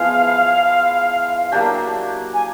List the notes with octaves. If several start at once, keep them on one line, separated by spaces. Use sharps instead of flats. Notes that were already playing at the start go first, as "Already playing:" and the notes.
Already playing: F3 G#3 B3 E4 F5
F#3 A#3 D4 G4
G#5